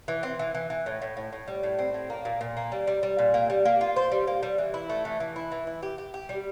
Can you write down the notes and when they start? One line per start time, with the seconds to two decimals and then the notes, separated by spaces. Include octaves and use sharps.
0.08 E3
0.23 C4
0.39 E3
0.55 E3
0.70 E3
0.86 A2
1.02 A2
1.17 A2
1.33 A2
1.48 G3
1.63 A2
1.79 C4
1.94 A2
2.10 A#3
2.25 A#2
2.41 A#2
2.57 A#3
2.72 G3
2.87 G3
3.03 G3
3.18 A#2
3.34 A#3
3.50 G3
3.65 A#3
3.81 F4
3.96 C5
4.12 G3
4.27 A#3
4.43 G3
4.58 E3
4.74 E4
4.89 A3
5.05 E3
5.20 E3
5.36 E4
5.52 E3
5.67 E4
5.83 G4
5.98 G4
6.14 G4
6.29 G3